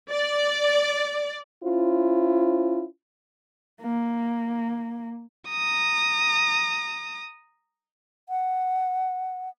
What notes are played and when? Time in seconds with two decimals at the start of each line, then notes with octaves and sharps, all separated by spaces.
0.10 D5
1.63 C#4 E4 F4 C5
3.81 A#3
5.49 A#5 D#6
8.29 F#5